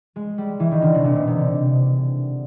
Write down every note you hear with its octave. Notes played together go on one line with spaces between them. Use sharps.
G#3
G3
E3
D#3
D3
C3
A#2
B2
C3
D3